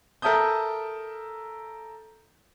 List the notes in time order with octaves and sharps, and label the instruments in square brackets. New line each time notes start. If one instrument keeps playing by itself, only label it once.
[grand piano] A4 A#4 E5 A5 D#6 G6